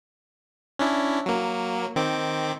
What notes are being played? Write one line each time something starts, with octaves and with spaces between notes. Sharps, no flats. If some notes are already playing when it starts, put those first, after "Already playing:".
C#4 D4 E4
F#3 A#3
D#3 C4 D6